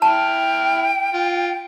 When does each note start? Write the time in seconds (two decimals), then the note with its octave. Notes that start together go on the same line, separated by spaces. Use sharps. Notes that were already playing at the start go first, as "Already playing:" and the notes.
0.02 E4 G5 A5 F6
1.14 F4